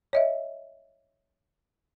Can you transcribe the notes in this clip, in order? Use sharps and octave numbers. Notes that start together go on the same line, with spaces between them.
C#5 D#5 E5